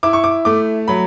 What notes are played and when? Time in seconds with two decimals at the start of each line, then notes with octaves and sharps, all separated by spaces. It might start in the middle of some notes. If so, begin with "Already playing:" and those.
0.03 E4 D6
0.13 C#6
0.24 D6
0.45 A3 D6
0.88 F#3 B5